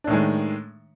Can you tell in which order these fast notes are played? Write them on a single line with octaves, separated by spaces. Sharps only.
D4 A2 D#3 G#3